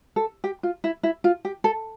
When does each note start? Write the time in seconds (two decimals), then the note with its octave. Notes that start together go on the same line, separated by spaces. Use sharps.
0.16 A4
0.44 G4
0.63 F4
0.84 E4
1.03 E4
1.24 F4
1.45 G4
1.64 A4